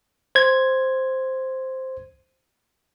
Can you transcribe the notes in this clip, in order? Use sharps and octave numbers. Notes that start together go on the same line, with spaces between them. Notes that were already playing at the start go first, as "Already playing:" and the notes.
C5 G#6